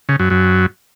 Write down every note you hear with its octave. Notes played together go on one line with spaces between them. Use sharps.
C#3
F#2
F#2